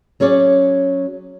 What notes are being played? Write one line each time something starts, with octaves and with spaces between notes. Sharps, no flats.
F#3 C#4 G#4 C#5 D5